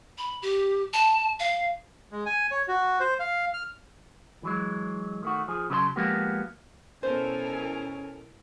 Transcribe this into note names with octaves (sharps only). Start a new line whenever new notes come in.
B5
G4
A5
F5
G#3
G#5
C#5
F#4
C5
F5
F6
E3 F#3 G#3
D#3 A3 F#4
F3 G#4
C#3 F#3 G4 B4 A5 C6
F3 G#3 A#3 B3 F#4 G4
B2 C#4 E4 A4 A#4 C5 G#5